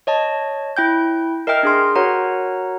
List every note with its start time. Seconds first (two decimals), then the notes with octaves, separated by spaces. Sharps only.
0.07 C#5 D#5 A5
0.77 E4 G5 G6
1.47 A#4 D#5 E5 G5 F6
1.63 D4 G#4 C6
1.96 F#4 A#4 C#5 F#5 A#5